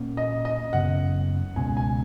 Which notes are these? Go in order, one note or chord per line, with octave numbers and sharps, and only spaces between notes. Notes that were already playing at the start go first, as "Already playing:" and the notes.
Already playing: A#2 A#3 C#4
D#5
D#5
F#2 C#3 F#3 B3 F#5
C#2 B2 G#3 C#4 G#5
G#5